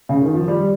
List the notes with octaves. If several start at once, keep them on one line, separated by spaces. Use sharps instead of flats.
C#3
D#3
F3
G3